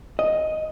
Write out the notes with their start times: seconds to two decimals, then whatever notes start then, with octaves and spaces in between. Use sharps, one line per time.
0.19 D#5